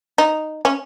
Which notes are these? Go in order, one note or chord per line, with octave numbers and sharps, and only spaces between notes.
D#4
C#4